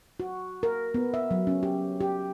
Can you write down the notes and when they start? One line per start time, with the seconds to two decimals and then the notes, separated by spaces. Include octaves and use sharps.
0.20 F#4
0.63 A#4
0.94 B3
1.14 E5
1.31 F#3
1.47 C#4
1.63 G4
2.00 G4